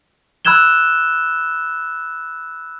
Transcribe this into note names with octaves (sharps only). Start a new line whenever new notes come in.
B5 E6 F#6 G#6 E7 G7